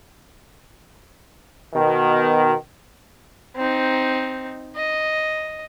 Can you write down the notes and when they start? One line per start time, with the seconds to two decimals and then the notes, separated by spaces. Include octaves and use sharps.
1.74 B2 D#3
3.57 C4 D#4
4.76 D#5